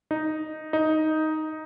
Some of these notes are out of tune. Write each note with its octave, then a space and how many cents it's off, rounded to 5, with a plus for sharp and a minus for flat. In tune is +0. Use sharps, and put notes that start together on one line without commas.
D#4 -5
D#4 +5